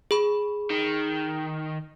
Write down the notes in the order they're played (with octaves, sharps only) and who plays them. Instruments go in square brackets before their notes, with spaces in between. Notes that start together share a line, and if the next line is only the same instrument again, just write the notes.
[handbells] G#4 B5
[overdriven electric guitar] D#3